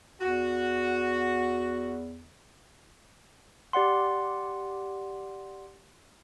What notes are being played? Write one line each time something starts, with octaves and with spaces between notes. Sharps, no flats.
E2 F#4
G4 D5 F#5 C6